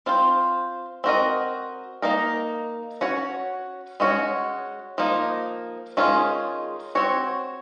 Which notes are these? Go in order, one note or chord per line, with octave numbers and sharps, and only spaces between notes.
C4 F4 C5
C4 F#4 A#4 D#5
A#3 D#4 A#4
C#4 F#4 C#5
G#3 C#4 F#4 C#5
F3 A#3 D#4
D#3 G#3 C#4 F4 G#4
C4 F#4 C#5